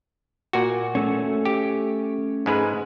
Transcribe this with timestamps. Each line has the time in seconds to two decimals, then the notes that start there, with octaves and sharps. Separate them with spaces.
0.53 A#2 F#4
0.95 A3 C#4
1.45 G4
2.46 G#2 G#3 B4